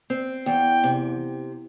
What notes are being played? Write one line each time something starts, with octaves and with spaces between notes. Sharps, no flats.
C4
E2 G5
C3